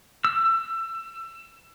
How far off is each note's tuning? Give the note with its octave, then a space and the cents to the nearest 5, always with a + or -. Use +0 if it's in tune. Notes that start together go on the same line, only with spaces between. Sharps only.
E6 +25